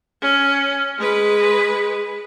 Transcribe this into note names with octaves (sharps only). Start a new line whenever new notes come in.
C#4
G#3 B4